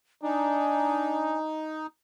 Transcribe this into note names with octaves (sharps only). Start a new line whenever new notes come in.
D4 D#4 G#5